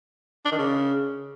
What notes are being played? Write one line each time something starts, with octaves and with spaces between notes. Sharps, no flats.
D4
D#3
C#3